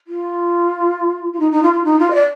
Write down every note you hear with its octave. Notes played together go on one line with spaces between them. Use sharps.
F4
F4
D#4
D#4
F4
F4
D#4
F4
D#5
D5